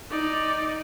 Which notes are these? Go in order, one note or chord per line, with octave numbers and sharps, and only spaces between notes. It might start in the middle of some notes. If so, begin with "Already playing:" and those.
D#4 D5